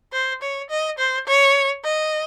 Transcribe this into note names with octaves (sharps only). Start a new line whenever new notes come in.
C5
C#5
D#5
C5
C#5
D#5